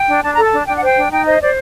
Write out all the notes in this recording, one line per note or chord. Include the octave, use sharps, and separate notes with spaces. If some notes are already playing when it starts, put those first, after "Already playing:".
Already playing: G5
D4
D4 A5
A4 A#5
A5
D4
D4 G5
F#5
C5 G5
D4
D#4 G5
C5 D#5
C5 D5